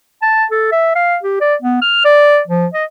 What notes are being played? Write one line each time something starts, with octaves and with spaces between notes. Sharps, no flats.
A5
A4
E5
F5
G4
D5
B3
F6
D5
F3
D#5